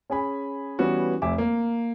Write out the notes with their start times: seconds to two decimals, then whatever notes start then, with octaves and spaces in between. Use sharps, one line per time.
0.10 C#4 G#4 G#5 B5
0.79 E3 G3 B3 C#4 F#4
1.22 F1 E5 G#5 D6
1.38 A#3